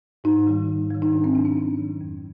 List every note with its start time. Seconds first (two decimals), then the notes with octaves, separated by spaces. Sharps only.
0.24 G#2 D#4
0.47 D#3 G3
0.68 G#2
0.90 D#3 G3
1.02 D#4
1.12 G#2 D4
1.24 C4
1.34 D#3 F#3 D4
1.45 C#4
1.57 G#2 D4
1.78 D#3 F#3
2.01 F2